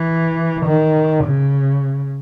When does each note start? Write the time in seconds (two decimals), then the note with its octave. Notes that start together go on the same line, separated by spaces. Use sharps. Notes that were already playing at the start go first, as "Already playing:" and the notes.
Already playing: E3
0.66 D#3
1.24 C#3